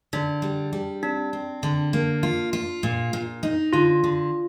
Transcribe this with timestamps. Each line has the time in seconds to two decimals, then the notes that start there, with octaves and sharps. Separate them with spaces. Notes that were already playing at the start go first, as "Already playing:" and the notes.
0.13 D3 D4
0.42 G3
0.73 G3
1.03 C4 D4
1.33 C4
1.63 D3
1.93 A#3
2.23 F4
2.53 F4
2.83 A#2
3.13 A#2
3.43 D#4
3.73 D3 F4
4.04 D3